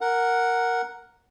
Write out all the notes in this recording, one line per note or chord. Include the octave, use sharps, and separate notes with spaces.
A#4 F#5